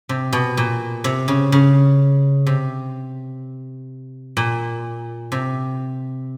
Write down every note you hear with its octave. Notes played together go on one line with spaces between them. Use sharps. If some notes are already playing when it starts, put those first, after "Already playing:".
C3
B2
A#2
C3
C#3
C#3
C3
A#2
C3